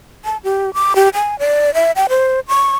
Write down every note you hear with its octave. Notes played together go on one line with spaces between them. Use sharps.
A5
G4
D6
G4
G#5
D5
E5
G5
C5
C#6